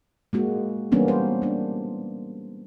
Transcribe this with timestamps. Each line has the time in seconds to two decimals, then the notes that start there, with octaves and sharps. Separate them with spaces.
0.33 G#3 A#3 F#4
0.92 E3 G3 A#3 B3 C#4 D4
1.08 C5
1.42 A#3 D4